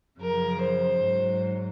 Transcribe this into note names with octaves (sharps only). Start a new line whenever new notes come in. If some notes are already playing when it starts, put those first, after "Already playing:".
F#2 C#3 F3 A#4
C5
G#2 F#3